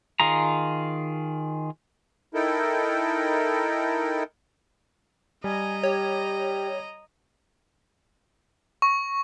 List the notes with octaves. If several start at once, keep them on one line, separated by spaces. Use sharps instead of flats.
D#3 F4 G#4 A#5
D#4 E4 A4 A#4 G5
G3 D#5 G#5 A#5
G4 C#5
C#6